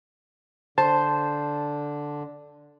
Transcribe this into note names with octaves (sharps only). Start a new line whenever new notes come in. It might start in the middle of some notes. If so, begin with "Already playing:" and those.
D3 C5 A5